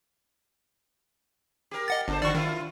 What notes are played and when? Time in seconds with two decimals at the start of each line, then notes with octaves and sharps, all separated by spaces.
1.71 G4 A#4
1.88 D#5 F#5 A6
2.08 G1 D4 C5
2.22 D3 F#4 D5 C#6
2.35 D#3 E4 F4